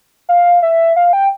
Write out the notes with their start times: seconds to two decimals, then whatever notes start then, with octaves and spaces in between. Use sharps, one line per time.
0.29 F5
0.62 E5
0.96 F5
1.13 G5